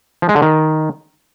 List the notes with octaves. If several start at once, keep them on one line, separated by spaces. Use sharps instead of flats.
F3
G#3
D3
D#3